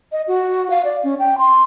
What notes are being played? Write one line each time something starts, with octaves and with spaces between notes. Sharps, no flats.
D#5
F#4
F5
D5
C#4
G5
C6